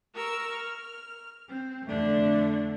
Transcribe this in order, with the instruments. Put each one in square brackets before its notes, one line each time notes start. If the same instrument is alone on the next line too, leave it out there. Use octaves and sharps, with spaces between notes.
[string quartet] A#4 C#6 E6
F6
C4
[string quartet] F2 D3 D4 [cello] A3